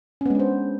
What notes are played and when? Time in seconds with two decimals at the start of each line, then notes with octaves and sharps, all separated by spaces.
0.21 C#4
0.26 B3
0.30 G#3
0.35 D4
0.39 C5